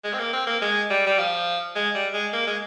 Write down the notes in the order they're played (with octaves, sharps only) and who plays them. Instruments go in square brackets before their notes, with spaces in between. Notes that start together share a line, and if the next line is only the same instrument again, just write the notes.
[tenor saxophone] G#3
C4
A#3
C4
A#3
G#3
G3
G3
F3
G#3
G3
G#3
A#3
G#3